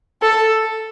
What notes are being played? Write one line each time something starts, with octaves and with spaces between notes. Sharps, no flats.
A4